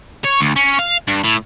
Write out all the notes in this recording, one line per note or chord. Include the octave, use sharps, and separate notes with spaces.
C#5
D2
C#4
F5
G2
A2